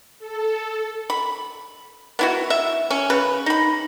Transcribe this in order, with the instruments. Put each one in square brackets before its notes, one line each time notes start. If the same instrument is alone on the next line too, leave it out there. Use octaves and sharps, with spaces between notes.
[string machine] A4
[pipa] B5
B3 E4 F#4
E5
C#4
C#3 B4
D#4 B5